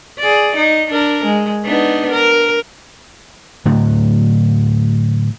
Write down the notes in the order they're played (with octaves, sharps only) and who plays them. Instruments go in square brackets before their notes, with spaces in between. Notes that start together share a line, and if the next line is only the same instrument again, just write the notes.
[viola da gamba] G#4 D5
D#4
D4 A#4
G#3
B3 D4 D#4
A#4
[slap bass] A2 D3 F#3